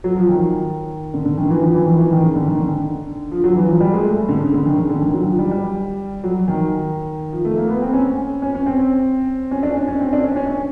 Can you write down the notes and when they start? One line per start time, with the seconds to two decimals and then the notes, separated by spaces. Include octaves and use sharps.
0.04 F#3
0.16 F3
0.29 D#3
1.14 D3
1.25 D3
1.38 D#3
1.50 E3
1.62 F3
1.74 E3
1.86 D#3
1.99 E3
2.11 D#3
2.22 C#3
2.35 D3
2.48 D#3
2.59 D3
3.31 F3
3.44 F#3
3.56 E3
3.68 F3
3.81 G3
3.93 G#3
4.05 A3
4.29 D3
4.41 C#3
4.53 D3
4.66 D#3
4.77 C#3
4.89 D3
5.02 D#3
5.14 F#3
5.26 F3
5.39 G3
5.51 G3
6.24 F#3
6.48 D#3
7.32 F3
7.45 A3
7.58 A#3
7.69 B3
7.82 C4
7.93 C#4
8.42 C#4
8.55 C#4
8.66 C4
9.51 C#4
9.63 D4
9.76 C#4
9.88 C#4
10.00 C4
10.13 D4
10.24 C#4
10.36 C#4
10.49 C#4